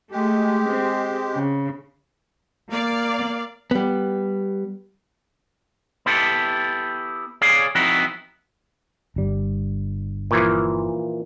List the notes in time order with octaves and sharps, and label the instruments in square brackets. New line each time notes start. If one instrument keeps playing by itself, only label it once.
[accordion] G#3 G4 [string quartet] A3
[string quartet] C4
C#3
[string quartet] A#3 [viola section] D5 F5
[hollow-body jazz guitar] G3 B3
[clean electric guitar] B3 E4 G4 A4
G#4 C#5 D5 F5 G#5
F3 B3 C4 D#4 E4 F#4
[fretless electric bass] G1 G3
[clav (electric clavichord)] A#2 E3 F3